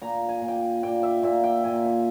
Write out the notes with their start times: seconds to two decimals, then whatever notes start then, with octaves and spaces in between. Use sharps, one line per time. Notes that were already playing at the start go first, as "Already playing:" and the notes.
0.02 A#2 A#5
0.29 G#5
0.42 A#2
0.48 G5
0.56 G#5
0.83 A#2 G5
1.03 E5
1.23 A#2 E5
1.44 G5
1.64 A#2 G#5
1.85 E5